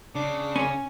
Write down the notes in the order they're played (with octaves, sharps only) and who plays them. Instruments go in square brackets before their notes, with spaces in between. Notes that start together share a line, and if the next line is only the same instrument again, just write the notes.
[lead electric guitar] C#3 [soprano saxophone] D4
[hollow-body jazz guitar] C#4